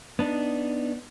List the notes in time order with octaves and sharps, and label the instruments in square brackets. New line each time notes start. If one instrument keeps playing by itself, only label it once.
[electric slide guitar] B3 D4 D#4